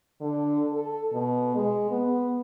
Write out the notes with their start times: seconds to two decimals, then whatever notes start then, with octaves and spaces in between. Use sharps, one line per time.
0.21 D3
0.73 A4
1.13 B2
1.56 G#3
1.91 B3